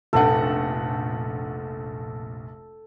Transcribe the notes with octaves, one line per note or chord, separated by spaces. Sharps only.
F1 A#1 A4 F#5 G5